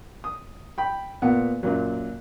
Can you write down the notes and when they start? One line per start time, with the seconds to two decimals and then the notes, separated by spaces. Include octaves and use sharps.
0.24 D#6
0.78 G5 B5
1.22 A#2 B3 F#5
1.63 F#2 A#2 F#3